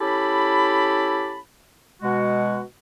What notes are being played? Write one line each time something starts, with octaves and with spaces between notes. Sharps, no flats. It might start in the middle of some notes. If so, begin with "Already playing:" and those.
C#4 E4 G4 A4 A5 B5
B2 G#3 F#4